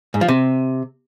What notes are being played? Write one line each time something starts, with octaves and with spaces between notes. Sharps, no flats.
G#2
F3
C3